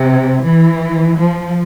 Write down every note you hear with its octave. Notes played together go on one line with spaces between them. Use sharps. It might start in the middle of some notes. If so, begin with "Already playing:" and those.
Already playing: C3
E3
F3